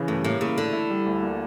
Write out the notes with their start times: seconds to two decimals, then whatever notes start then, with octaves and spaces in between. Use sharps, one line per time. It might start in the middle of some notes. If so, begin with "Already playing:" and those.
Already playing: C#3 E3
0.08 G2 A3
0.24 A2 A#3
0.41 C#3 E4
0.57 D3 A3
0.73 E4
0.90 G3
1.06 D2
1.23 A#3